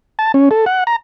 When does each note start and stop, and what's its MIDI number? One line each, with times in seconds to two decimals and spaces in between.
0.19 0.32 81
0.34 0.49 61
0.51 0.65 69
0.66 0.84 78
0.87 0.96 82